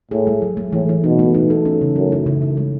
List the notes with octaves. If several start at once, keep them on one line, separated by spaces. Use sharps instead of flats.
A2 G#4
G#3
F#3
A3
A2 E3
E4
B2 D#4
A3
D#4
A4
C#4
C#3
F#2 A3
E4
C#3
C#3
G#3